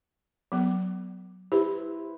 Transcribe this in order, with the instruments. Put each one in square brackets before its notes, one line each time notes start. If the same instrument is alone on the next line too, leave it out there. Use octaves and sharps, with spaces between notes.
[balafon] F#3 B3
[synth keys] E4 B4 C5 [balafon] G4